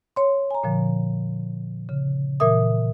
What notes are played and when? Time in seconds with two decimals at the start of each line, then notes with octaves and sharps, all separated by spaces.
0.16 C#5 C6
0.51 G#5 A#5
0.63 A#2 D3 F3
1.89 C#3
2.40 A#2 E3 A#4 E5 D#6